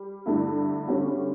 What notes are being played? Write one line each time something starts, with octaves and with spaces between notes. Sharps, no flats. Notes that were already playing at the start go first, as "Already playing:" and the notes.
Already playing: G3
G2 D3 A3 E4
D3 G3 C#4 F#4